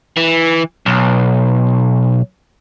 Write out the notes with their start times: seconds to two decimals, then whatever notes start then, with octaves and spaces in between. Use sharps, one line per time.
0.17 E3
0.86 B1